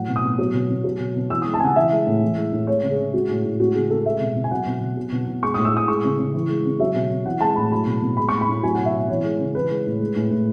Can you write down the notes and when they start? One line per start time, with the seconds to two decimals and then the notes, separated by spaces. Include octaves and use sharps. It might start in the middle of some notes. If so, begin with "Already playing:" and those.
Already playing: A2 F#3 F#5
0.09 B2
0.16 D#6
0.23 B2
0.39 F#3
0.54 B2
0.69 B2
0.84 F#3
1.00 B2
1.16 B2
1.30 E3 E6
1.42 G#3 D#6
1.54 A5
1.60 C#3 F#5 G#5
1.76 E3 E5
1.92 G#3
2.07 A2
2.22 E3
2.37 G#3
2.53 A2
2.67 G#3 C#5
2.83 C#3
2.91 G#4
2.99 C#3
3.14 G#3 F#4
3.29 A2
3.45 A2
3.60 G#3 F#4
3.74 C#3 G#4
3.90 C#3 A4
4.06 G#3 E5
4.21 B2
4.35 B2
4.44 G#5
4.51 F#3 F#5
4.67 B2
4.81 B2
4.97 F#3
5.12 B2
5.27 B2
5.42 G#3 C#6
5.54 A2 D#6
5.65 E6
5.73 A2 D#6
5.88 G#3 C#6
6.04 C#3
6.19 C#3
6.34 E3
6.49 G#3
6.65 C#3
6.80 F#3 E5
6.95 B2
7.11 B2
7.25 E3 F#5
7.41 G#3 A5
7.56 A2 B5
7.72 F#3 B5
7.86 B2
8.02 B2
8.17 G#3 B5
8.29 A2 C#6
8.41 B5
8.48 A2
8.63 F#3 G#5
8.75 B2 F#5
8.85 E5
8.93 B2
9.09 E3 C#5
9.24 G#3
9.39 C#3
9.54 E3 B4
9.70 G#3
9.86 A2
10.00 G#3
10.16 A2
10.31 A2